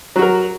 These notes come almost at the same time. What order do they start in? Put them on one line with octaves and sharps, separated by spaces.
F#3 F#4 A#4